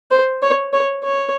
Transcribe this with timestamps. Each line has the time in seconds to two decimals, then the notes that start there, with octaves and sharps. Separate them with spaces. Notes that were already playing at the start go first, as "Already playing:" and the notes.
0.11 C5
0.42 C#5
0.73 C#5
1.04 C#5